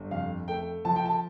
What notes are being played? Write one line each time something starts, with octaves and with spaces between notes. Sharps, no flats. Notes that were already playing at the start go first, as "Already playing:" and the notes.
Already playing: G1
F2 F5
A3 G5
F3 A5
G5
A5